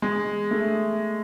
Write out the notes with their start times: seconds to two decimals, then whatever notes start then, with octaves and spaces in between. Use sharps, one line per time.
0.02 G#3
0.51 A3